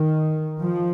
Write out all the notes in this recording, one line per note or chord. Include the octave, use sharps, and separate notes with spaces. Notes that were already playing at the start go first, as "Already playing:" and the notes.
Already playing: D#3
F3